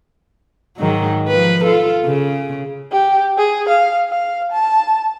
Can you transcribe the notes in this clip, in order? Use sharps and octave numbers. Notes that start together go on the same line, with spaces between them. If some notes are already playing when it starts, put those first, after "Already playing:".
G#2 D#3 F#3
F3 B4
F4 A4
C#3
G4
G#4
F5
F5
A5